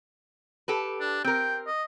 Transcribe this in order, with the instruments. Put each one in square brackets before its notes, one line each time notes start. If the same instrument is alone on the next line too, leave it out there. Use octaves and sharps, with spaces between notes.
[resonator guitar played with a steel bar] G4 A4 B4
[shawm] D4
[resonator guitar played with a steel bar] C4 A#4 [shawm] G5
[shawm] D#5